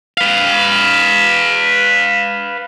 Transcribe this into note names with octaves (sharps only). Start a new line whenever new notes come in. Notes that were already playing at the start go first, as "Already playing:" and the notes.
B4 F5